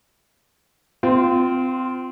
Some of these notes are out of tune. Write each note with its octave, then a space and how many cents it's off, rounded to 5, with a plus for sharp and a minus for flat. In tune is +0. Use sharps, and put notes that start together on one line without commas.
C4 -25 F4 +0